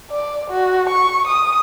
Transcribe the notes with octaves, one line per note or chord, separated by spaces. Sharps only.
D5
F#4
C#6
D#6